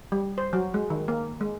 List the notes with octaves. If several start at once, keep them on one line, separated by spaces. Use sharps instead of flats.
G3
C5
F#3
G#3
D#3
A#3
G#3